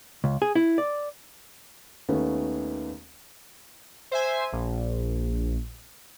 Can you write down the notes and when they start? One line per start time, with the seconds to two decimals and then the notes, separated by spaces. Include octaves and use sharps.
0.24 C#2
0.42 G#4
0.55 E4
0.78 D5
2.08 D#2 D#3 A3 B3 C#4
4.11 C5 E5 G#5
4.52 A#1